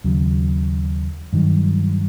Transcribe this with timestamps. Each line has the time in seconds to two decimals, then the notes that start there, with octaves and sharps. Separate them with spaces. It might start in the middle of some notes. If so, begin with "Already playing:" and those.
0.04 D#2 C#3 F#3
1.33 G2 D#3 F#3